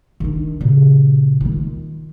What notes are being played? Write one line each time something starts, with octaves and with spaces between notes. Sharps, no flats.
D#3 D4
A#2 C#3
D#3 F4